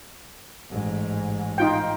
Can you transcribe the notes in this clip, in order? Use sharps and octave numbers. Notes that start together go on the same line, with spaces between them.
A1 G#2
D#4 F4 G5